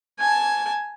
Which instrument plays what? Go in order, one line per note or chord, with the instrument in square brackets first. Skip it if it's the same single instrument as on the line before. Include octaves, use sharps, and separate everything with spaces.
[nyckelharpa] G#5 A5